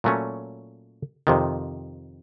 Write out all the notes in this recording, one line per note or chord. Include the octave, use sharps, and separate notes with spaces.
A#2 F#3 A3 C#4
F2 C3 D#3